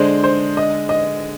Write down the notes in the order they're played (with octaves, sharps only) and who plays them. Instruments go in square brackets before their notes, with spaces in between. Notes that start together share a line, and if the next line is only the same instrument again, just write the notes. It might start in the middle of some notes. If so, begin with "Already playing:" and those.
Already playing: [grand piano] D3 G#3 D4 [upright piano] C5
[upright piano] C5
D#5
D#5